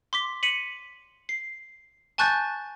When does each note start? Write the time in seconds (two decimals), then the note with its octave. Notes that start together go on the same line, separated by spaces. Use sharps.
0.13 C6 D6 B6
0.43 B6 C#7 D#7 F#7
1.29 C7
2.18 G#5 A5 C#6 F#6 G6 A6